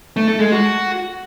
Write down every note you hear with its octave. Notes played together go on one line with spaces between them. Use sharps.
A3
A4
G#3
F#4